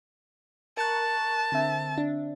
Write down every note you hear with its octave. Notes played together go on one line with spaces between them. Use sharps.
A#4 A5 C#6 F#6
D3 C4 E5
D4